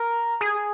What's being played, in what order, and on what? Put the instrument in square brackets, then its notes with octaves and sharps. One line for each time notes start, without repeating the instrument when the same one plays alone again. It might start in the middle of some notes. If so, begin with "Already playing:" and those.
Already playing: [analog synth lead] A#4
G#4